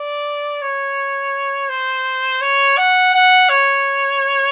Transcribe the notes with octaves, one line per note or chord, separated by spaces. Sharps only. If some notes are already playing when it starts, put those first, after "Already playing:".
Already playing: D5
C#5
C5
C#5
F#5
F#5
C#5